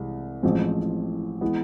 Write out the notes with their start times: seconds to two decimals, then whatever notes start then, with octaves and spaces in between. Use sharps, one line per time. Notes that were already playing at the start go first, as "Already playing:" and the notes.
Already playing: C2 C3 E3 G#3
0.43 A1 A2 F3 G#3 C4
1.41 E3 G#3 B3